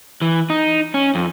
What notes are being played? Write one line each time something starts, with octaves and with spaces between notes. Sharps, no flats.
E3
D#4
C#4
F2